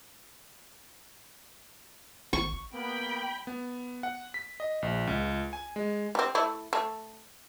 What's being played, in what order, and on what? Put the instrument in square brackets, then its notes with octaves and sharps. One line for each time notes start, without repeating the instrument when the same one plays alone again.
[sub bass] G#1 [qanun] C#6
[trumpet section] A#3 B3 [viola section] G5 B5
[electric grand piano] B3
F#5
B6
D#5
A#1
C#2
G#5
G#3
[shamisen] G3 C4
A3 E4
A3